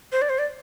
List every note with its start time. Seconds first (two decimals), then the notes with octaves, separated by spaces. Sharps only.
0.12 C5
0.22 D5
0.29 C5
0.39 D5